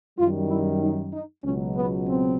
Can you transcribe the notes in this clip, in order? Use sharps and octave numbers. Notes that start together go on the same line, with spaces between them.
F#2 D#3 G3 F4
E4
D#4
D#4
C#2 B2 F#3 C#4
B3
C4